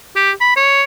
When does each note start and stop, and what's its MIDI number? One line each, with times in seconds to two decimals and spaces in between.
0.16 0.31 67
0.41 0.56 83
0.56 0.83 73